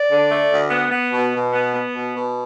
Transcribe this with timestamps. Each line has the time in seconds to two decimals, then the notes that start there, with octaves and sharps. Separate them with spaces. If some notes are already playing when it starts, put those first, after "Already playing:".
Already playing: D5
0.09 D3
0.29 A3
0.50 D2
0.70 B3
0.91 B3
1.12 B2
1.33 B2
1.53 B3
1.74 B3
1.94 B2
2.15 B2